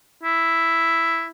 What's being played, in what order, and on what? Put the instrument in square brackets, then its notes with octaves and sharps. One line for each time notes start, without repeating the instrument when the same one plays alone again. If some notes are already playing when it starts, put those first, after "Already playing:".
[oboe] E4